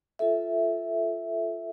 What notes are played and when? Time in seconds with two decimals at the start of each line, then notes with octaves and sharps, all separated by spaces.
0.19 F4 A4 E5